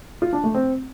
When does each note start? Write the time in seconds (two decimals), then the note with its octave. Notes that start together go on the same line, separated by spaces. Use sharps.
0.22 F4
0.33 D4
0.44 A3
0.54 C4